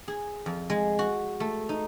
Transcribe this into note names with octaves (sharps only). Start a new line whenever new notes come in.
G#4
F2
G#3
F#4
A3
D#4